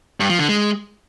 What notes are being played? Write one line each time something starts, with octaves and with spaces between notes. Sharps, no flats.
G2
F3
D3
G#3